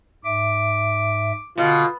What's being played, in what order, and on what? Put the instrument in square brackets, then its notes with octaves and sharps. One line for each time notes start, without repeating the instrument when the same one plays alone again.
[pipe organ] G#2 E5 [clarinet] D6
[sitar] B2 [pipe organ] D3 [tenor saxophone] F4